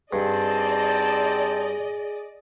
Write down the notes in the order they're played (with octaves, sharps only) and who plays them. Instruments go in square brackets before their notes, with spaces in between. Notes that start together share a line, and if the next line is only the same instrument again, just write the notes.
[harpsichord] G2 [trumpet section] C4 D#4 A5 [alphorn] G#4 [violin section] D5 D#5